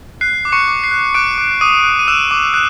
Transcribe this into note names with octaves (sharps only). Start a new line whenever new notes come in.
F#6 C7
D6
C#6 C#7
D6
C7
F#6
D6 F#6 D7
D6
D6 D#6 D#7
F#6
D#7
E6 F#6 E7
D6
F#6